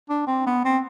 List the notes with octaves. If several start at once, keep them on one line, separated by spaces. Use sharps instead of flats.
D4
C4
B3
C4